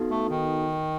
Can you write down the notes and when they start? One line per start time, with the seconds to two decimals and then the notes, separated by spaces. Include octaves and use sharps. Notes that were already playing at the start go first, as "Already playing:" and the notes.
Already playing: B3 D#4 F#4 A4
0.10 A3
0.29 D#3